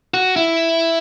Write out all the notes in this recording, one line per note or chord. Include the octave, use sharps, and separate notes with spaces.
F#4
E4